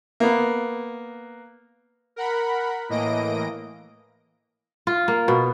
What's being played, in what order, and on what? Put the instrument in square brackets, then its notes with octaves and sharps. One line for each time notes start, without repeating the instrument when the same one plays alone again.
[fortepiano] A#3 B3
[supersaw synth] A#4 F#5 B5
A2 E3 A#3 D#5 A#6 D7
[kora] F4
A#3
B2